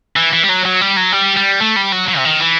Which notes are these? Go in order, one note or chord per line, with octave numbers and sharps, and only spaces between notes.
E3
E3
G3
F#3
F#3
G3
F#3
G3
G3
A3
G3
F#3
F#3
C3
D#3
E3